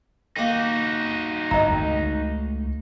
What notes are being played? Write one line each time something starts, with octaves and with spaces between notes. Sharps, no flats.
D#3 A#3 D#4 F#4
G1 D#5 A#5
C#2 A3